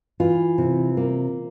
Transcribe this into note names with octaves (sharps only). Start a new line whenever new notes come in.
E3 F4
C3
A#3